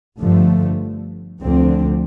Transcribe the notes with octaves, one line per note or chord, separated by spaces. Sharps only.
G1 G2 D3 F3 A3
D2 D3 F3 C4